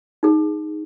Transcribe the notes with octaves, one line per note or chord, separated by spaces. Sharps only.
D#4 G#4